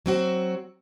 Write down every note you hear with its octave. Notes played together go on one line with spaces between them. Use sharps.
F#3 C4 F#4